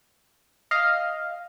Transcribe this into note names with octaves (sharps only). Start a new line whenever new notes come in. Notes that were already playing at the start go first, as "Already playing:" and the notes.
D#5 F5